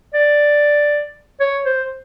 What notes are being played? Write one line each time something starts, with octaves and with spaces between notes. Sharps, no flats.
D5
C#5
C5